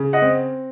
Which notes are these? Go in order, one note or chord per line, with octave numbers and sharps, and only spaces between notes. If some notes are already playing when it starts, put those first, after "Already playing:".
Already playing: C#3
D#5 F#5
C4